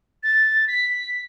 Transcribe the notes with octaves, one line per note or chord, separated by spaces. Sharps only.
A6
B6